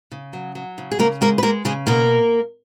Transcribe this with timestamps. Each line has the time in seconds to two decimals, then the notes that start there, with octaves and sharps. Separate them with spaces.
0.12 C#3
0.33 F#3
0.55 F#3
0.78 C#3
0.91 G#4
0.99 C#3 A#3 A#4
1.21 G#3 A#3 A#4
1.38 B4
1.43 G#3 A#3 A#4
1.65 C#3 G#3 G#4
1.87 B2 A#3 A#4